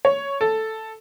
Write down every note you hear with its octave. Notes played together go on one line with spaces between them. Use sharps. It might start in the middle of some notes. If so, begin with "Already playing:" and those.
C#5
A4